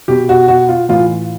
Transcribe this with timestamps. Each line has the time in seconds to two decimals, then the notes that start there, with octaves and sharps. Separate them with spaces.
0.08 B2 G4
0.29 F#4
0.48 F#4
0.69 F4
0.89 A2 E3 F4